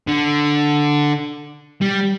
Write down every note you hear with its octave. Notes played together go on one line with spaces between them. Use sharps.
D3
G3